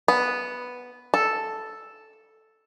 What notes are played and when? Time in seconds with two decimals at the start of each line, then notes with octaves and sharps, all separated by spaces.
0.08 B3
1.14 A4